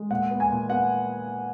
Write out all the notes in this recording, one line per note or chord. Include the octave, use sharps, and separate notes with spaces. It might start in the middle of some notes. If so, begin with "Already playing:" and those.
Already playing: G#3
A#2 F#5
B3
G#5
A#2
B3 F#5